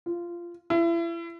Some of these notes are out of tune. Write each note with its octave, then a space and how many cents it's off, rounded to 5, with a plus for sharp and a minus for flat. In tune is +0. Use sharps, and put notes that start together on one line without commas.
F4 -15
E4 +35